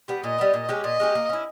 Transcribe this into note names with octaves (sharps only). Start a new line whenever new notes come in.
G3 B3
A#2 D#5
G3 B3
A#2
G#3 C#4 G4
A#2 D#5
G#3 C#4 G4
A#3
C#4 E4